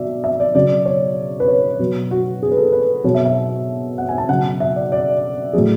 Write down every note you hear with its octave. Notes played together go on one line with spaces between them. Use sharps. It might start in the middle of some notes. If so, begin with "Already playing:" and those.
Already playing: B2 F#3 D5 E5
E5
D5
C#3 F#3 D5
C#5
B4
C#5
B2 F#3
F#4
G#4
B4
A4
B4
B2 F#3 C#5
E5
E5
F#5
G#5
A5
C#3 F#3 F#5
E5
D5
D5
A2 F#3 G#4